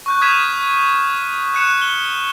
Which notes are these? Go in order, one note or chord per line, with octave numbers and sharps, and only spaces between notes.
C#6 F#6 G6
D#6 F6 G#6 B6 D#7 E7
F#6 C#7 E7
G7